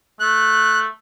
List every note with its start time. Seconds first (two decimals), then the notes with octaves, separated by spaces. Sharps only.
0.20 A3 F#6